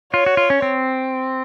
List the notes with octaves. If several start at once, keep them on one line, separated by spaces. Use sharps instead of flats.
F4 C#5
F#4
F4
C#4
C4